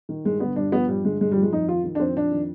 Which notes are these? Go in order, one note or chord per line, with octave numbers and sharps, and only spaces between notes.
D#3
G2 G#3
D3 B3
G2 D4
F3 B3
G2 G3
D3 G#3
G2 G#3
G3
F3
G#3
F2 D#4
D#3 F4
D#3
D4
F2 C4
F2 D4
D#3